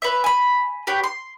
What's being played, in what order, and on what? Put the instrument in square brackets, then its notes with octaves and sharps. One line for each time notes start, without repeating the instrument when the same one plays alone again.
[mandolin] B4 C#5 E5
G#5 B5
G4 B4 C#5 G5
C6